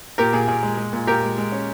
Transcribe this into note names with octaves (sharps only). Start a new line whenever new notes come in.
A#2 G4 A#4
A#2 G#4
A#2 G#4
G#3
G#3
A#2
A#2 G4 A#4
G#3
G#3
C#4